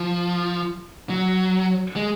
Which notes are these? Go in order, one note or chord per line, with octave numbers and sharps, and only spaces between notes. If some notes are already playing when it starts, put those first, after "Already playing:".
Already playing: F3
F#3
G#3